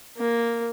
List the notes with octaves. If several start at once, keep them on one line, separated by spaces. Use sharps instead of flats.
A#3